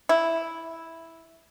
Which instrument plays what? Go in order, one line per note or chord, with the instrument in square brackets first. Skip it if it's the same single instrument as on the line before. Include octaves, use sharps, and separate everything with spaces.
[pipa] E4